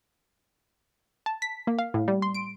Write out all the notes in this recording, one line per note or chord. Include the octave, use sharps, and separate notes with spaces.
A5
B6
A#3
F5
A2
G3
C6
D7